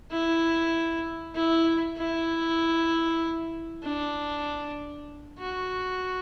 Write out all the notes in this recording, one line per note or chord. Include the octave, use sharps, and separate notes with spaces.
E4
E4
E4
D4
F#4